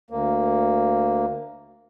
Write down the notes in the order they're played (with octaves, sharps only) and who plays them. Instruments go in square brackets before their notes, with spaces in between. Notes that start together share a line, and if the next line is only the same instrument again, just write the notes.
[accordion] D2 A#3